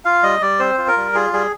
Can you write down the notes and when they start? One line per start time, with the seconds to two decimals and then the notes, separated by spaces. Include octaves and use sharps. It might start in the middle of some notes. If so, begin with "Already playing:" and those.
0.05 F4 F5
0.23 G3 D#5
0.41 G3 D5
0.59 C4 C5
0.78 F4
0.88 A#4
0.97 G3
1.14 F4 G#4
1.33 G3 G#4